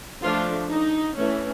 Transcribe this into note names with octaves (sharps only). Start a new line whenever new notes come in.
F3 A3 D4 F4
D#4
E3 A3 C#4